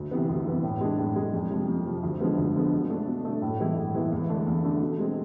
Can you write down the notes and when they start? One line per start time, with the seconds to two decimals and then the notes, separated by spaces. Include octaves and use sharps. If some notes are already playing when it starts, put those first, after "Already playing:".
Already playing: D2
0.11 C3 E3 B3
0.29 D2
0.46 C3 E3 B3
0.63 A2
0.81 G#3 D4
0.98 A2
1.16 G#3 D4
1.33 F2
1.50 C3 F3
1.68 F2
1.85 C3 F3
2.03 D2
2.20 D3 F3 G#3 B3
2.38 D2
2.55 D3 F3 G#3 B3
2.72 B2
2.90 A3 D4
3.07 B2
3.25 A3 D4
3.42 A2
3.59 E3 G#3 B3 E4
3.77 A2
3.94 E3 G#3 B3 E4
4.12 E2
4.29 D3 A3 D4
4.46 E2
4.64 D3 A3 D4
4.81 B2
4.99 G#3 C4